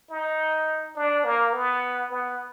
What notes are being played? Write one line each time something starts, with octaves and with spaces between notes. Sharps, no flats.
D#4
D4
A#3
B3
B3